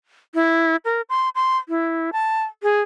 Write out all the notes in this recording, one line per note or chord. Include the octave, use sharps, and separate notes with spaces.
E4
A#4
C6
C6
E4
A5
G#4